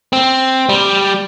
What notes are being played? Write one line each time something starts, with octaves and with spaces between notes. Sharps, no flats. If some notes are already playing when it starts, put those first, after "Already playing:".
C4
G3